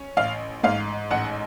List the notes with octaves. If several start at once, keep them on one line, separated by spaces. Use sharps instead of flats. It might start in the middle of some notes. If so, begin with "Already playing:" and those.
Already playing: C#4
A1 F5
G#2 F5
A1 F#5